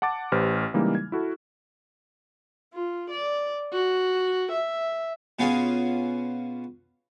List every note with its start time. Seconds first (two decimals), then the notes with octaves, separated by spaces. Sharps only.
0.02 F#5 A5 D6 A6
0.32 A1 G4 B4 C5 F6
0.74 C#3 E3 G3 G#3 A#3 D#4
0.95 G#6
1.12 E4 F#4 A4
2.73 F4
3.10 D5
3.72 F#4
4.51 E5
5.39 B2 B3 C#4 F4 F#4 G#4